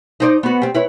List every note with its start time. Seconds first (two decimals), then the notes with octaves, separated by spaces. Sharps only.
0.20 D#4 C5 D5
0.43 B3 F#4
0.62 C4 G4
0.75 E4 B4 C#5